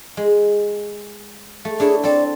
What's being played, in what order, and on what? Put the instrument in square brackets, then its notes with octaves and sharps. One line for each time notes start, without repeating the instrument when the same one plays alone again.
[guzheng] G#3
A3
[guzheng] D4 E4 C#5 [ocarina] G#4
[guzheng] C4 A4 [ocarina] D5